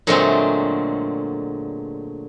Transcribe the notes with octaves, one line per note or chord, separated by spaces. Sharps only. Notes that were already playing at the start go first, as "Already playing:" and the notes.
A#2 D3 F#3 G#3 A3 C4